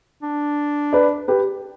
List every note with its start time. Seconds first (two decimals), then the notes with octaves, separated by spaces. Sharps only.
0.23 D4
0.93 B4 D5
1.28 G4 B4